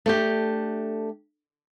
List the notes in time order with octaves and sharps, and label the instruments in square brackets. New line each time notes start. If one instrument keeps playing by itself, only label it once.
[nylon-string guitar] A3 D4 G4